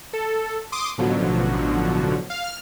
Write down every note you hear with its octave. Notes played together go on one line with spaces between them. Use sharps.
A4
C6 D6 D#6
A1 B2 D3 F3 F#3
F5
F6